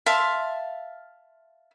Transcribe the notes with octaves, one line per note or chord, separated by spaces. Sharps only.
E5 F5 A5 C6